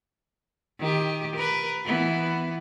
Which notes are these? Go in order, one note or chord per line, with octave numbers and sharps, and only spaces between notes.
D#3 G4
A#4 B4
E3 B3